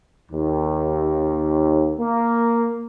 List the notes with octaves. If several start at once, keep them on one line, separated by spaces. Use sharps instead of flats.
D#2
A#3